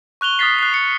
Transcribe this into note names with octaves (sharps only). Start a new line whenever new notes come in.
C#6 F#6 F7 G7
D#6 F6 F#6 A6 B6 C7
F#6 C7
C#7